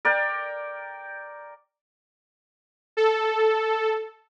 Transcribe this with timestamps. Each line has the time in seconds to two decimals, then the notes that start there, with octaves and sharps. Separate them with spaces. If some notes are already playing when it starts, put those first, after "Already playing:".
0.05 A#4 D5 G5
2.97 A4